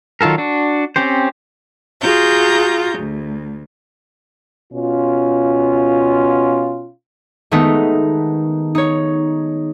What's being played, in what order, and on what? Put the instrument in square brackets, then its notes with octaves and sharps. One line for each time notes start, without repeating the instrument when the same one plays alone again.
[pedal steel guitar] D#3 F#3 F4 A4 A#4
D4 F#4
C4 C#4 G4 C5
[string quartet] F4 F#4 G#4 A#5 G6
D2
[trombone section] B2 C#4 F4
[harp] D#3 G#3 A3 B3 D#4
D#4 C#5